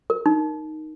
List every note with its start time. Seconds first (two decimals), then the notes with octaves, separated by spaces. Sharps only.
0.10 A#4
0.26 D#4